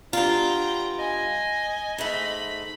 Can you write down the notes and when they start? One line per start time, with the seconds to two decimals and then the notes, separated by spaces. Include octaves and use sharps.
0.13 G2 B3 D4 F4 G5 A#5
0.99 D#5 G#5
1.98 G#2 A3 B5